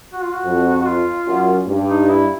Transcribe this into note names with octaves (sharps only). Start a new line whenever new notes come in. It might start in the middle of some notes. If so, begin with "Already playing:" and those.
F#4
F4
F#4
F2
F#4
F4
F#2
G2
D#4
E4